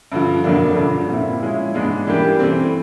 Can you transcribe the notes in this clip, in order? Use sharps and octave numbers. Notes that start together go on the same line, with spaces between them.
G2 D3 F3
F2 D3 F#3 A#3 D4
G2 D3 F3
A#2 G3 C4 E4
F3 G#3 C#4 E4
G#2 E3 G#3 B3 D4
E3 G3 A#3 D4 G4
E3 A3 C4